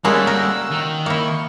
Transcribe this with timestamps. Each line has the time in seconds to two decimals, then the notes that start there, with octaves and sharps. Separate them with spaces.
0.05 G3 G#3 A#3 C#4 F#4 G#4 A4 E6
0.27 A#4
0.70 D#3
1.06 A#3 E4 C#6